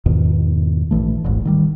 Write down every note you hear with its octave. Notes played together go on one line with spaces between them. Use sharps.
E2 G#2 B2 D#3
A#1 E3 A3
D#1 A1 G#2
D#3 F3 G3